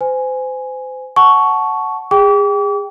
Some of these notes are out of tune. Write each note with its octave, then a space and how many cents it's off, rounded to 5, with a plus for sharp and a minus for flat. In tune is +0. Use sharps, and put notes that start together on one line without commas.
C5 -35 G#5 +0
F#5 +0 A5 -10 C#6 +5
G#4 -30 G5 +0 D6 -40